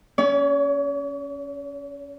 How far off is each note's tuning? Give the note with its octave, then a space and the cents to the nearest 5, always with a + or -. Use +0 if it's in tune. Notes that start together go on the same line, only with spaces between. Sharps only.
C#4 +10 C#5 +45